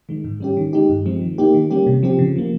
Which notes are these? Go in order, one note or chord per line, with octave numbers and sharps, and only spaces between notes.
D#3 G#3
G#2
G3 C#4 G4
D#3
G#3 D#4 G4
G2
F3 G#3 C4
D#3
A#3 D#4 G4
D#3
G3 A#3 C#4 G4
C3
F3 C4 G4
C#3
F3 A#3